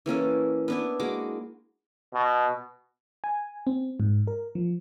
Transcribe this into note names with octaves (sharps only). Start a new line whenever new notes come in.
E3 A#3 C#4 A4
B3 D4 E4
G#3 A#3 F#4 D6
B2
G#5
C4
G#2
A#4
F3